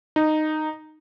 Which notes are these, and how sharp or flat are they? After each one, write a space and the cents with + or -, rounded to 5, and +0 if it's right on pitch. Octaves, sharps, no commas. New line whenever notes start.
D#4 -10